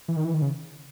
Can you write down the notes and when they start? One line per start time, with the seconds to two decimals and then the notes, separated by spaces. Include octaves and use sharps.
0.08 E3
0.16 D#3
0.25 E3
0.34 D#3
0.42 C#3